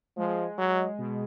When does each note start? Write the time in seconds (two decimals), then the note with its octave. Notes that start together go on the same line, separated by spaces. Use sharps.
0.17 F3 G#3
0.58 F#3 G#3
0.98 B2